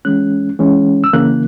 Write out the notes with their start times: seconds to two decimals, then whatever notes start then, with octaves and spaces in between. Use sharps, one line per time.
0.05 E3 G#3 C#4 F#6
0.59 E3 G#3 C#4
1.04 E6
1.13 C#3 E3 A#3 F#6